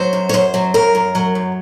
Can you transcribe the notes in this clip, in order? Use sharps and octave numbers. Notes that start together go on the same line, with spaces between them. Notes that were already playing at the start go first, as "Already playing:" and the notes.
Already playing: F#3 C5
F#2
C#5
F#2 C5
F#3
F#2 A#4
F#2
F#3
F#2